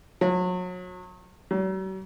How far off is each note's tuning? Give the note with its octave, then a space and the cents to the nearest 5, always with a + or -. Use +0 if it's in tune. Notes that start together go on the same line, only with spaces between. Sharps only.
F#3 -35
F#3 +45